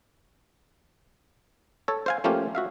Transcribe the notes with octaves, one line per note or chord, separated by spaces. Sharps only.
A4 C#5
C5 F5 G#5
F3 A3 A#3 C#4 F4 G4
F#4 E5 F5